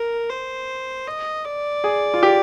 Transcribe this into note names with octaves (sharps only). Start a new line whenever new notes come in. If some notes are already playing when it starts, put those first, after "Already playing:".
Already playing: A#4
C5
D#5
D5
G#4
F4
G4